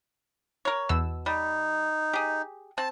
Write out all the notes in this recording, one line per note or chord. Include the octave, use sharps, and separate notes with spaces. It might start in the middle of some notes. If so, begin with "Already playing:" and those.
A#4 C#5
E2 B2 E6
G3 D#4
G4 G#4
C4 A5